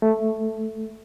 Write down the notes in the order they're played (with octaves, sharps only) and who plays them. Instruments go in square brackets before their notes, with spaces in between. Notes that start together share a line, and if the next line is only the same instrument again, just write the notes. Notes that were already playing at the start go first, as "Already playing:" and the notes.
[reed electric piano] A3